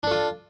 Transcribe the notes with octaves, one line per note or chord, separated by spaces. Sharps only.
D4 F4 A4